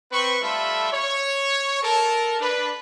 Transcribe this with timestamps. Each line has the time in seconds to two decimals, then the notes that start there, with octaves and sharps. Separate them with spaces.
0.12 C4 B4 C#6
0.42 G3 A3 F4 A4 E5 B5
0.92 C#5
1.83 A4 A#4 A5
2.40 D4 B4